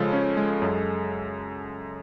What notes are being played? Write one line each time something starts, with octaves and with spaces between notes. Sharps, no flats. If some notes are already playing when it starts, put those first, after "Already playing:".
Already playing: C#3 F3 G#3 A4
C#4
G#3
F#2